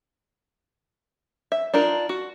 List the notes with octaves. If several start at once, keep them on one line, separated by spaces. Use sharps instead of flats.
E5
D4 D#4 F4 A#4
F#4